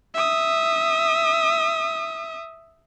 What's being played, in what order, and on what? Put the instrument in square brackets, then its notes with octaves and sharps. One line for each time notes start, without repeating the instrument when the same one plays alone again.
[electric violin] E5 D#6